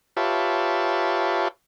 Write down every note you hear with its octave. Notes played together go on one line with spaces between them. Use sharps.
F4 G4 B4 C#5 E5 A5